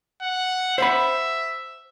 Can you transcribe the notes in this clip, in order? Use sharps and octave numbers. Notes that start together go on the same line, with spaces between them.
F#5
C5 E5 F#5 B5